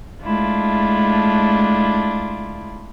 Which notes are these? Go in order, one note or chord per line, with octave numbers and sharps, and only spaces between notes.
G#3 A3 D4 E4 F4